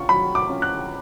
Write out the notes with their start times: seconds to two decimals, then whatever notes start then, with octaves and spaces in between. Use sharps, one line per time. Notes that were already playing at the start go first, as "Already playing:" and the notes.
Already playing: C#4 F4 C#6
0.09 F#3 B5
0.35 D6
0.49 C#4 F4
0.62 F#6